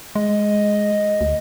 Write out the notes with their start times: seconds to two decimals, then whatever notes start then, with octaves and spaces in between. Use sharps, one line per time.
0.15 G#3 D#5
1.21 D2